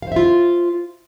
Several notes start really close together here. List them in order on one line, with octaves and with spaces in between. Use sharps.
F5 C5 E5 F4